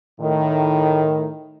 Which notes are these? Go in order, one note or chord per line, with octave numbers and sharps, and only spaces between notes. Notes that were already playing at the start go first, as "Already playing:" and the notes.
A2 D#3